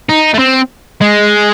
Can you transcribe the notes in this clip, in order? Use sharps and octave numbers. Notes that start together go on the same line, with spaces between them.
D#4
A3
C4
G#3